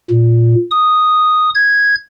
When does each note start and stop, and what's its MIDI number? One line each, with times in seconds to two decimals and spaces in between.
0.10 0.55 46
0.71 1.50 87
1.55 1.95 92